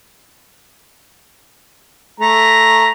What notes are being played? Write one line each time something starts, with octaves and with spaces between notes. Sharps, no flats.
A3 A#5